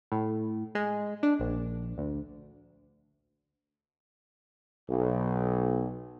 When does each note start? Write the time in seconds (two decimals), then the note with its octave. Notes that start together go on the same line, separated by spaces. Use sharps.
0.12 A2
0.75 G#3
1.23 D4
1.40 A#1
1.98 D2
4.90 B1